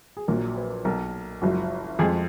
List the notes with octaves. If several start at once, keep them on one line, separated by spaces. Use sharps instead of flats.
G#4
A#1 A#2 F#3 A#4
B4
B1 B2 F#3 A#4
F#1 F#2 F3 G#3 F#4
F2 F3 G#3 G#4